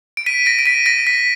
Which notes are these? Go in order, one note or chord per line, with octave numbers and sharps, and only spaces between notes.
D7
B6 D#7
A#6 D7
D7
B6 D#7
A#6 D7
B6